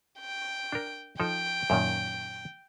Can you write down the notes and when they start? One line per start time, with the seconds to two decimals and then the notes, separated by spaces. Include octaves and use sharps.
0.20 G5
0.72 D4 A#4
1.20 F3 D#4 A4 G5
1.70 F#2 A#2 D#3